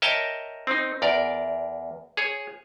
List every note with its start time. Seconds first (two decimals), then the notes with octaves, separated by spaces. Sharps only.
0.02 A#4 C#5 D#5 E5 G5 A5
0.67 C4 D#4
1.02 E2 A#4 D5
2.17 G#4 C#5